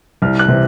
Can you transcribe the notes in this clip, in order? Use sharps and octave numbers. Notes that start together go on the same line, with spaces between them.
C2 F6
F#6
C3 E3